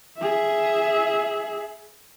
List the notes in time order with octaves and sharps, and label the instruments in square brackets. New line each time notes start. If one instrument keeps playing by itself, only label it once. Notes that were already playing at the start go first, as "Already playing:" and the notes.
[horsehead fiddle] G#4 E5